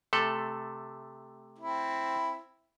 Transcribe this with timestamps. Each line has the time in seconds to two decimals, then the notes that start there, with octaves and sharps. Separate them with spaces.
0.13 C3 A3 A4
1.59 C4 E4